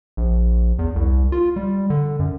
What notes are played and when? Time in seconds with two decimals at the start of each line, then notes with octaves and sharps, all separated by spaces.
0.17 A#1
0.79 E2
0.96 C2
1.32 F4
1.56 G3
1.90 D3
2.19 F#2